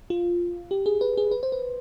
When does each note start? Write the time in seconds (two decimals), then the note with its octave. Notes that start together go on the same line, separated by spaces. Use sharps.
0.10 F4
0.71 G4
0.86 G#4
1.01 B4
1.17 G#4
1.31 B4
1.43 C5
1.52 B4